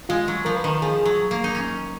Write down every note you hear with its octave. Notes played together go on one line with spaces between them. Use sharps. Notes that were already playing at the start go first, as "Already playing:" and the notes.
G#3 F4
F#3
F3 A#4
B4
D#3 A#4
F3 G#4
F#3
A#3
D#4
C#4